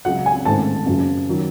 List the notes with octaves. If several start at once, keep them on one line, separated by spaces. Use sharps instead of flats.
C#2 C#3 F#3 F#5
G#5
A1 G#2 D#3 A3 C4 A5
F#1 F#2 C#3 F#3
D#3 F#3